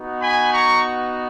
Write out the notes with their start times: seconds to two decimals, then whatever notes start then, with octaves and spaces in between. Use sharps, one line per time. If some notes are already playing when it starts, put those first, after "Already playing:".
Already playing: B3 D#4 F#4
0.21 G#5 B5
0.52 A#5 C#6